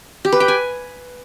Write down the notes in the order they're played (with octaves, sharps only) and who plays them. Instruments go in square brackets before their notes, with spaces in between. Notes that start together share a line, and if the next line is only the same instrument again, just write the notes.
[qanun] G4
B4
G5
G#5